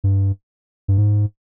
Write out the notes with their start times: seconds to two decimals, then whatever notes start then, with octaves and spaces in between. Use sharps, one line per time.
0.04 G2
0.88 G2
0.98 G#2